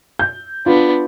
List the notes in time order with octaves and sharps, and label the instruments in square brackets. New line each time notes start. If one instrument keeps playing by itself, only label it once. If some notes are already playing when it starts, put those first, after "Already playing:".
[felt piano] G6
[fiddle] B3 D4 [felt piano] F4